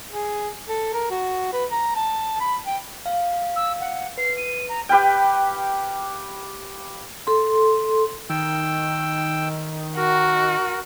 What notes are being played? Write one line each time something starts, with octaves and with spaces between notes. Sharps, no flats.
G#4
A4
A#4
F#4
B4
A#5
A5
B5
G5
F5
E6
F#5
B4 C7
D#7
A#5
G4 B4 F5 G5
A4 C6
D#3 G5 E6
F#4 A#4